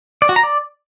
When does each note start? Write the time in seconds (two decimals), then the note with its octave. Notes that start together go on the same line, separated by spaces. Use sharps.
0.22 D5
0.29 F#4
0.36 A#5
0.43 D5